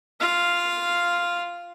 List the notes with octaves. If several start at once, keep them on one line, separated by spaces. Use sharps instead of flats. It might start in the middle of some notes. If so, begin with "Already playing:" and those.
F4 F5